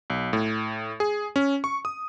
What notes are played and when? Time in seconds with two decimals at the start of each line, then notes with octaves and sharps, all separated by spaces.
0.10 B1
0.33 A2
1.00 G#4
1.36 C#4
1.64 C#6
1.85 D#6